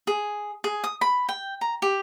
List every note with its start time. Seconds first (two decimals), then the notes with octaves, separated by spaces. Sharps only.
0.07 G#4
0.64 G#4
0.84 D#6
1.01 B5
1.29 G5
1.61 A#5
1.82 G4